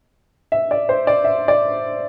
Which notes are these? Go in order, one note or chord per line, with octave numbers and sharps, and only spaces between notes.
E5
D5
C5
D5
E5
D5